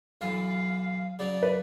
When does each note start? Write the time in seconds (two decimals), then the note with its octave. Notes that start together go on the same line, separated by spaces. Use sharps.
0.21 B1 F#2 E3 F5
1.19 C#3 F#3 C#4 D5
1.43 B4